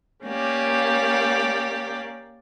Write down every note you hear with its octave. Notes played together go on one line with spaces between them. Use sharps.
A#3 C#4 G4 D5